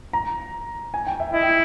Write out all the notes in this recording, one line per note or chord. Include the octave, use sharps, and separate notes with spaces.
A#5
G#5
G5
E5
E4 D#5
G5